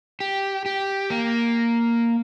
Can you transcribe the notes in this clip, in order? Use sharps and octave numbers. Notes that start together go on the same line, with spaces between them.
G4
G4
A#3